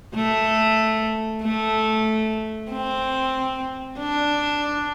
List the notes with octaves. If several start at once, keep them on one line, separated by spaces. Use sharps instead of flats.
A3
A3
C4
D4